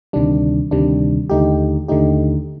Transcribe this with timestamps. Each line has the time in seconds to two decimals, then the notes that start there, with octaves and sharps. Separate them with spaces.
0.13 D2 C3 D#3 G3 D4
0.71 D2 C3 D#3 G3 D4
1.30 D#2 D3 A3 D#4 G4
1.88 D#2 D3 A3 D#4 G4